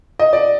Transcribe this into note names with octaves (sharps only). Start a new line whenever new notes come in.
D#5
D5